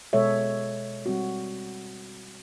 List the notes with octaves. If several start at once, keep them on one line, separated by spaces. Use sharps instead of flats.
B2 G#3 A4 C#5 E5
G3 C4 F#4